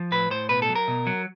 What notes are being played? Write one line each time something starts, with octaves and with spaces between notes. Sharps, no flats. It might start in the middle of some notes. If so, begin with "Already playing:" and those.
Already playing: F3
A2 B4
A2 C5
B2 B4
A4
F#3
A#4
B2
F#3